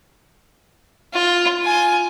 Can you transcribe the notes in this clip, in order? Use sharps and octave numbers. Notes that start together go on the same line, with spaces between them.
F4
F4 G#5